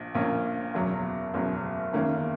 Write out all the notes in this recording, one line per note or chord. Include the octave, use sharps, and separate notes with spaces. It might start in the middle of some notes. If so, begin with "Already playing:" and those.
Already playing: A#1 A#2
A#1 A#2 A#3 C#4
F#1 E2 B2 F#3
F#1 E2 B2 F#3
F#1 E2 D#3 A#3 C#4